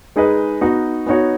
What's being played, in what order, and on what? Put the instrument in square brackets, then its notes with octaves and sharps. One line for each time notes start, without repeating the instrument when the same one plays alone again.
[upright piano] G#3 D#4 G#4 B4 D#5
B3 D#4 F#4
B3 D#4 F#4 C#5